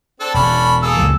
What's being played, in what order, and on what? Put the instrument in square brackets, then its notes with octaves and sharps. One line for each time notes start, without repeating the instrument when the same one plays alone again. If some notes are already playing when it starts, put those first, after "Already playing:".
[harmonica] C4 D4 A4
[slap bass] E1 [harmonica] C#4 D4 B5
[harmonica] A#3 G#4 A4 [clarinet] E6
[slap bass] C#2 A#2 F#3